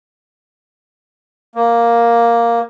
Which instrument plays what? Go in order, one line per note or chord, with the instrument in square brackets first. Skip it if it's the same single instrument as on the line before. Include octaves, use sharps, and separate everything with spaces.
[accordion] A#3